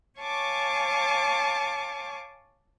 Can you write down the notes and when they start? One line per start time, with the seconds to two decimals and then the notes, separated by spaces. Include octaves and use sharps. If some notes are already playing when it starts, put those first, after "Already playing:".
0.18 C#5 F5 G#5 A5 C#6 D6